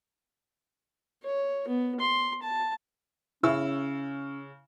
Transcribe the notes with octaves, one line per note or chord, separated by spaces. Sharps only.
C#5
B3
C6
A5
C#3 C#4 E4 E6